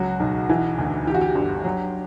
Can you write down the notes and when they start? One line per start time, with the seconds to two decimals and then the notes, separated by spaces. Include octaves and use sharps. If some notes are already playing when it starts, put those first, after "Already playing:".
Already playing: C#2 F#3 F#4
0.20 B1
0.49 E3
0.78 D2
1.07 E3 G4
1.14 F#4
1.21 G4
1.35 G1
1.64 F#3